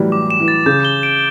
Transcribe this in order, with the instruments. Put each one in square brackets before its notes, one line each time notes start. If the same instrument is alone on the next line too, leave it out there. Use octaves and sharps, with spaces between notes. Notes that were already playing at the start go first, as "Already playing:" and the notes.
Already playing: [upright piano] A2 E3 F#3 G3
[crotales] D6
E7
[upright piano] E3
[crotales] A6
[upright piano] C#3 [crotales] G6
[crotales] G7
D7